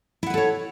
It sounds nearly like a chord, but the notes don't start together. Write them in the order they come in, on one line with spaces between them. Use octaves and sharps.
E4 F#5 B4 A4 C#5